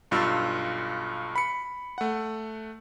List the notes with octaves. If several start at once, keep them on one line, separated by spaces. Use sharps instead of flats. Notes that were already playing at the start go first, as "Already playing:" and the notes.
B1 G2 F4 E6 A6
B5 C#7
A3 F#5